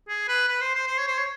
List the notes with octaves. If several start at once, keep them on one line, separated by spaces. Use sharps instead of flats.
G#4
B4
B4
C5
C5
C5
C#5
C5
C#5